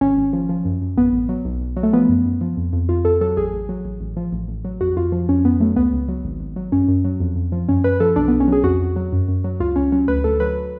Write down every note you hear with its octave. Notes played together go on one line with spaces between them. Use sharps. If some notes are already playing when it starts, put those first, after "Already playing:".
G#1 C#4
G#1
F3
F3
F#2
F#2
A1 B3
A1
F#3
B1
B1
F#3
A3
F3 B3
F#2
F#2
F3
F2
F2
F2 F4
F2 A4
F#3 A4
A1 G#4
A1
F#3
A1
A1
F3
A1
A1
F#3
F2 F#4
F2 F4
F3
F2 C#4
F2 B3
F#3 A3
C#2 B3
C#2
F#3
G#1
G#1
F#3
F#2 C#4
F#2
F#3
F2
F2
F3
F#2 C#4
F#2 B4
F3 A4
B1 D4
B1 B3
C#4
F#3 G#4
F2 F#4
F2
F#3
F#2
F#2
F#3
C#2 F4
C#2 C#4
F#3 C#4
D2 B4
D2 A4
F#3 B4